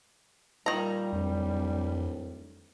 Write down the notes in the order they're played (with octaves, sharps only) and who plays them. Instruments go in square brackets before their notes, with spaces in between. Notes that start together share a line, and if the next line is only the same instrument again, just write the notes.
[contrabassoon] A#2 [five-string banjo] D#3 A#5 [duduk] G3
[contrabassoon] D1 [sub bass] F2